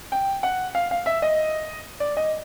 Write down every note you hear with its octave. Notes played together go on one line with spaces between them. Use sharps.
G5
F#5
F5
F5
E5
D#5
D5
D#5